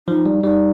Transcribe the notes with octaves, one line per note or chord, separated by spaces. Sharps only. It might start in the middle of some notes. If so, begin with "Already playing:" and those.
F3 D#4
G3
G3 D#4